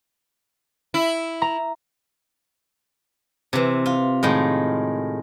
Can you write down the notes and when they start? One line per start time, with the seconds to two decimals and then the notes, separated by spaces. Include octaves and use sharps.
0.94 E4
1.42 A#5
3.53 C3 E3
3.86 F4
4.23 A2 D#3 G#3